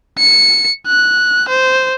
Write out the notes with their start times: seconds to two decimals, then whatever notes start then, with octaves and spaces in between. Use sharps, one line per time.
0.18 C#7
0.87 F#6
1.49 C5